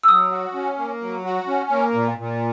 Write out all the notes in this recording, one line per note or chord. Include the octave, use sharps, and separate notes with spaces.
E6
F#3 D#6
F#4
C#4
A#3
F#3
F#4
C#4
A#3
A#2
A#2